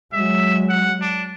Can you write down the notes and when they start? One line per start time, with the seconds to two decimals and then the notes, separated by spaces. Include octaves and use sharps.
0.13 F#3 G#3 E5
0.69 F#5
1.01 D4